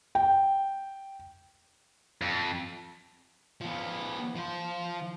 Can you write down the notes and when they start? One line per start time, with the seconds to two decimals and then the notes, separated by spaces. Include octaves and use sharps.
0.15 G5
2.22 F2
3.61 F3 B3
4.36 F3 C5